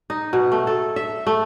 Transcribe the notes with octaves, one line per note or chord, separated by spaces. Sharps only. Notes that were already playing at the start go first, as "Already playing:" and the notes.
D#4
B2
A3
A4
E5
A3